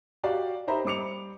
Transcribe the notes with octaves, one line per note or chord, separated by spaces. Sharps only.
F#4 G4 D5 F5
D#4 G4 C5 E5 A#5 B5
G3 C5 D6 C#7 F7